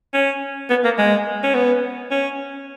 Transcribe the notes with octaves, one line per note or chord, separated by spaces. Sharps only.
C#4
B3
A#3
G#3
C#4
B3
C#4